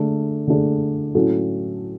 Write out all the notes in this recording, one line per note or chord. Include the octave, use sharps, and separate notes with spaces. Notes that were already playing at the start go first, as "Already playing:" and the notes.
Already playing: D3 A3 D4 G#4
D3 A3 D4 G#4
A2 F#3 C#4 F#4 A4